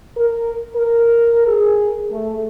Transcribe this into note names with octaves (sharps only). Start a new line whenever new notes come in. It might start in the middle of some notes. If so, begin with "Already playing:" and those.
A#4
A#4
G#4
A3